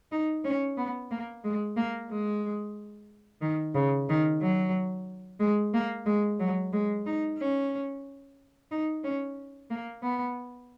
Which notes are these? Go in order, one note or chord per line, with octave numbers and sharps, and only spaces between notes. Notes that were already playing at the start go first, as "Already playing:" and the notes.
D#4
C#4
B3
A#3
G#3
A#3
G#3
D#3
C#3
D#3
F#3
G#3
A#3
G#3
F#3
G#3
D#4
C#4
D#4
C#4
A#3
B3